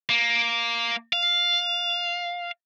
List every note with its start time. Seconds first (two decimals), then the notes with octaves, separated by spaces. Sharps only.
0.09 A#3
1.13 F5